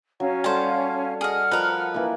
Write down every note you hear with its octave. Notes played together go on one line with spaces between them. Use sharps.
F#3 C#4 F5
G3 A4 C5 F#5 A5
G#4 D#5 F#5 F6
F3 A#4 B4 D#5 A#5
E3 A#3